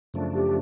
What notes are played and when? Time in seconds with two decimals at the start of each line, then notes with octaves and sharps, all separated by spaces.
0.14 F#2 C#3 F3 A3 D4
0.34 G4